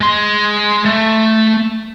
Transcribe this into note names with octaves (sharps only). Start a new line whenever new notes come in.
G#3 C6
A3